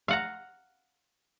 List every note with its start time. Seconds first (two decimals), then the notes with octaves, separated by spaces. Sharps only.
0.08 F5 F#5 A#5